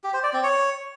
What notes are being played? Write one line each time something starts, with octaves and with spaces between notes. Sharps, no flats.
G4
C5
D5
C4
C#5